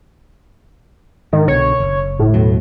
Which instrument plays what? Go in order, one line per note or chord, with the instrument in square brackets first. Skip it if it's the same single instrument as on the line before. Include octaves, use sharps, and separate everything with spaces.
[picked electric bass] G#2 [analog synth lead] D#3
[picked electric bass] C2 B2 D3 [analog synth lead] C#5
[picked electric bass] F#1
[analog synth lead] A2
[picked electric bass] D#2 B2 F#3